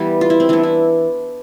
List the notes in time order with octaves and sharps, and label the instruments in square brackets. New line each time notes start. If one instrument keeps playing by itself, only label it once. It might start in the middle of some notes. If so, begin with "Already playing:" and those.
Already playing: [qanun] E3 G3 B3
F4
E4
C4
E3 B3 D4
E4